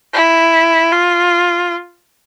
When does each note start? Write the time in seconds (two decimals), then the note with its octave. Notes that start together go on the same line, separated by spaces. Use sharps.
0.14 E4
0.92 F4